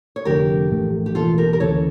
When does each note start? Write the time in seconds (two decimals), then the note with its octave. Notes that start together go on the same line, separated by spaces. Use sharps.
0.16 C#5
0.25 F1 F2 D3 A3 G4 A#4
0.70 A#1 A2 E3 A3
1.06 G4
1.15 E1 E2 E3 A#3 F4 A4
1.38 G4 A#4
1.53 A#4
1.60 D2 C#3 E3 A4 C#5